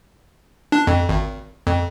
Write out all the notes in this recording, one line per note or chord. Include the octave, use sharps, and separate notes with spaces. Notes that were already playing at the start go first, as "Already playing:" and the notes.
D4
F2
G#1
F2